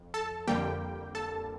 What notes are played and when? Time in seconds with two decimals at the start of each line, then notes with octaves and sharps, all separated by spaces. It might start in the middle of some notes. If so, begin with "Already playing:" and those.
Already playing: F2
0.14 A4 A5
0.47 F2 D3 G3 A#3 G4 G5
1.15 A4 A5